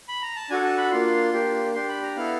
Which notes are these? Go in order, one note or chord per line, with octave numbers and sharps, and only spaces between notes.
B5
A#5
A5
D4 F#4 A4 G#5
A5
B5
A#3 D4 F4 C6
A#3 D4 G4
D4 G4 C6
B5
A#5
B3 E4 A4 F5